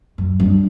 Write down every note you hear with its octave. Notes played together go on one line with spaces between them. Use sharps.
F#2
G2